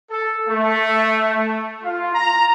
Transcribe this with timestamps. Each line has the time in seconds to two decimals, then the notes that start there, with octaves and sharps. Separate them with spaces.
0.11 A4
0.49 A3
1.84 F4
2.14 A#5